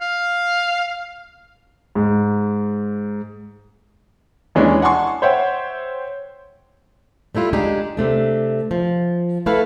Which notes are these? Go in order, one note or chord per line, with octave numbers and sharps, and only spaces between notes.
F5
G#2
D#2 E3 G#3 C#4 D4
D5 F#5 G#5 A5 C6 C#6
C5 C#5 E5 F#5 G5
G3 A3 E4 F4
G#3 D4 D#4 G4
C3 A3 D4
F3
A3 E4 A4 B4 F5